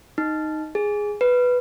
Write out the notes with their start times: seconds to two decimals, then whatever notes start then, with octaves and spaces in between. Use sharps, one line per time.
0.18 D#4
0.75 G#4
1.21 B4